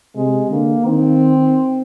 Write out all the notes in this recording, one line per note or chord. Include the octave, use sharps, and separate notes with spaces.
C3 G#3
D3 A#3
D#3 C4